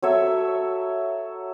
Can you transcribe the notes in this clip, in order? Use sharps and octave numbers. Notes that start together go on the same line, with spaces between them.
F#3 A4 C#5 E5